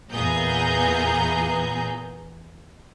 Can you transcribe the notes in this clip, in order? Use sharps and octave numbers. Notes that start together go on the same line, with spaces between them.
E2 A#2 B3 G#4 A#5 G6